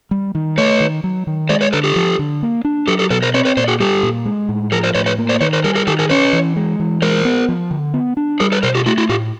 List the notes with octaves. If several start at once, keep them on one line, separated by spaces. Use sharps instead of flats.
G3
D#3
A3 B4 C#5
D#3
F#3
D#3
G#3 C5 D5
B4 C#5
D3 A4 B4
G4 A4
F3
D3
A#3
D4
F#3 G4 A4
G4 A4
B2 A4 B4
A#4 C5
C4 B4 C#5
B4 C#5
A#2 C5 D5
F#4 G#4
G3 G4 A4
A#2
G#3
A2
F3 G#4 A#4
A#4 C5
A2 B4 C#5
B4 C#5
A#3
C5 D5
D#3 B4 C#5
A#4 C5
G3 G#4 A#4
G#4 A#4
D#3 G4 A4
G#4 A#4
C#4 B4 C#5
E3
G#3
E3
G#3 A#4 C5
B3
F3
D3
B3
D4
G3 G#4 A#4
A4 B4
B2 A#4 C5
F4 G4
A3 E4 F#4
E4 F#4
A2 F4 G4